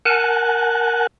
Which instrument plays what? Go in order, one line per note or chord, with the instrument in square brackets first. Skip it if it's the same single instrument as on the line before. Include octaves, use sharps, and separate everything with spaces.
[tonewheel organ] A#4 F#5 G#5 A5 F#6